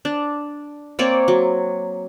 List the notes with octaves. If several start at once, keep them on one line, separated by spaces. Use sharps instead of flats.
D4
A#3 C4 C#5 D5
F#3